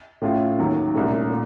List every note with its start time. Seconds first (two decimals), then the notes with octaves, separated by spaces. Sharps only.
0.22 A2 A3 C#4 F4
0.59 D#2 D#3 F#3
0.94 C2 A#2 A3 C#4
1.30 A#2